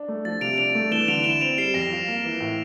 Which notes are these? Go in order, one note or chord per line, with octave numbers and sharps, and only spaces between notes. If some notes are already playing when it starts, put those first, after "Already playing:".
Already playing: D4
A3
F3 A6
C3 D7 F7
D4 D7 F7
A3
E3 E7 G7
D3 D7 F7
E4 E7 G7
C4 D7 F7
G3 C7 E7
F2 A#6 D7
F4
A#3
E3
A2